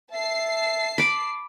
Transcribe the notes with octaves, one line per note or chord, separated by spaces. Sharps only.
E5 A5 C7
B5 D6